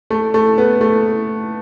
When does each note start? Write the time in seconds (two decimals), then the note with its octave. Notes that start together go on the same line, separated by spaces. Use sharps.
0.10 A3
0.34 A3
0.58 B3
0.81 A3